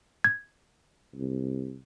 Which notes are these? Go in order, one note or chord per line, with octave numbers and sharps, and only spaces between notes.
G#6
C2